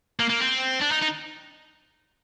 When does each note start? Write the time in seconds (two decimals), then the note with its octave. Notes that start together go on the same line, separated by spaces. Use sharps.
0.20 A#3
0.30 A#3
0.41 C4
0.82 D4
0.92 D#4
1.02 D#4